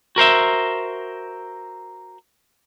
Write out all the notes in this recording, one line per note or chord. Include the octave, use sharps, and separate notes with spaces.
F#4 A#4 C5 E5